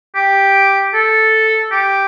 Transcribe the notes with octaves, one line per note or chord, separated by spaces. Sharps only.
G4
A4
G4